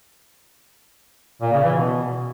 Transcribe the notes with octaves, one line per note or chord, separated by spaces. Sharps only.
A#2
C#3
E3
B2